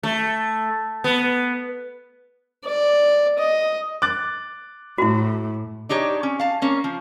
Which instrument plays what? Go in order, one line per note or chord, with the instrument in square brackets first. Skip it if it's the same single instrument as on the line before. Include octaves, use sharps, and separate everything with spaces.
[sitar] A3
B3
[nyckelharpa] D5
D#5
[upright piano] D6 F#6 A6
[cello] A2 [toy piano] E4 F#4
[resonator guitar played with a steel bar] D4 D#4 G4 C#5
C#4
F5 A5
A#3 C#4
F3